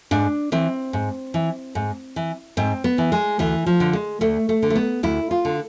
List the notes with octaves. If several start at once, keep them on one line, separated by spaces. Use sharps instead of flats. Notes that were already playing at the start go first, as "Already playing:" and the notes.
G#2 D4
E3 C4
G#2
E3
G#2
E3
G#2 C4
B3
E3
G#3
D2 E3
F3
D3
G#3
D2 A3
A3
D3
A3
B3
D2 E4
F4
D3